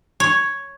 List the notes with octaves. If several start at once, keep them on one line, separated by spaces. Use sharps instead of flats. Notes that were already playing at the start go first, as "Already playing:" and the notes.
C#5